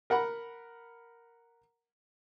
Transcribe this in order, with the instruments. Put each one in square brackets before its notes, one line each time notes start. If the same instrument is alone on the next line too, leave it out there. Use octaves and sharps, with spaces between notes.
[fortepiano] A#4 F#5 A#5 B5